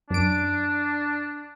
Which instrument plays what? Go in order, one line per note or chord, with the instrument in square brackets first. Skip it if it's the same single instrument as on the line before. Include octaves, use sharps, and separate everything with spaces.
[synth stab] F#2 D7 [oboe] D4